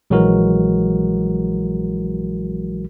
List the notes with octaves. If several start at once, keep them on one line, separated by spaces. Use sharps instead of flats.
A#1 E3 F#3 G#3 F#4 A#4